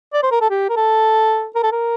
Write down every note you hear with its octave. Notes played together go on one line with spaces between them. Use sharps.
D5
C5
A#4
A4
G4
A#4
A4
A#4
A4
A#4